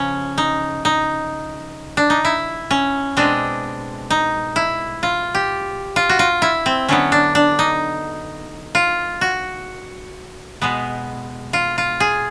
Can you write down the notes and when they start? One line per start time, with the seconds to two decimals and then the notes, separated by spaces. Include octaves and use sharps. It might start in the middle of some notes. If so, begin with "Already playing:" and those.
Already playing: C#3 F3 C#4
0.38 D#4
0.85 D#4
1.97 D4
2.10 D#4
2.25 E4
2.71 C#4
3.17 B2 G#3 C4 D4
4.10 D#4
4.56 E4
5.03 F4
5.35 G4
5.96 F4
6.09 F#4
6.19 F4
6.42 E4
6.66 C4
6.88 D3 F#3 B3 C#4
7.12 D4
7.35 D4
7.59 D#4
8.75 F4
9.21 F#4
10.62 B2 G#3 B3
11.53 F4
11.78 F4
12.00 G#4